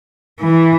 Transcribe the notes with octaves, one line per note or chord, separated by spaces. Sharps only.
E3